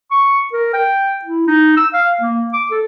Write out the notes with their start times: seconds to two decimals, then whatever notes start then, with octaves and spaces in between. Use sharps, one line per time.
0.11 C#6
0.53 A#4
0.73 G5
1.25 E4
1.48 D#4
1.77 E6
1.94 F5
2.21 A#3
2.53 D6
2.71 A4